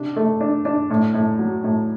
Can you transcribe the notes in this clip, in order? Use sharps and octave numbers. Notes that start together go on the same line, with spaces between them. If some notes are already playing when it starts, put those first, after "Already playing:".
Already playing: C3 D4
A3
D4
D4
A2
A2
F#3
A2